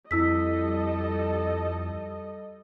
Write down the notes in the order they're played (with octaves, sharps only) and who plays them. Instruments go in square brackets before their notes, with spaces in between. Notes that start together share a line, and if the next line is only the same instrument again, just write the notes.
[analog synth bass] F2 [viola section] G3 A4 D#5 [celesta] E4 E6 B6